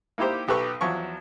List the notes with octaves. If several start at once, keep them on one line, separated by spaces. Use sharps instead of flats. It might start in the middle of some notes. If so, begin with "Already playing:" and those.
A#3 D#4 E4 G4 C5
B1 G4 A4 B4 C#6
E2 F3 F#3 C#6